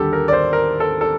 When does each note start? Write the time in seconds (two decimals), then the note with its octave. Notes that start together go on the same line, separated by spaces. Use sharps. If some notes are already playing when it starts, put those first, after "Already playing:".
Already playing: D#2 D3 G3 G4 A4
0.13 A#4
0.28 D5
0.33 C5
0.53 A#4
0.80 A4
1.01 A4